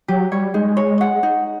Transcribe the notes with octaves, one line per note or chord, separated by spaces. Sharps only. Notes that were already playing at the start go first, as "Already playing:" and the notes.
F#3 G4
G3 C#5
G#3 D#4
C#5
F#5
D#4